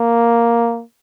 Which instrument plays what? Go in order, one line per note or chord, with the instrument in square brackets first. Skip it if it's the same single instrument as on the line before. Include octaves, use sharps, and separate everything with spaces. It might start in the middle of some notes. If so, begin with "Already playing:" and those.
Already playing: [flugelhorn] A#3